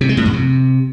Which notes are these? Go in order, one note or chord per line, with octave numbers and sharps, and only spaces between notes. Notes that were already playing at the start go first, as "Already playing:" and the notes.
C3
G#3
A2
F2
C3